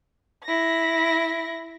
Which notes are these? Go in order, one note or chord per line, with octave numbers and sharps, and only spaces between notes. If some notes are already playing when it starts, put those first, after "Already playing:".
E4 A#6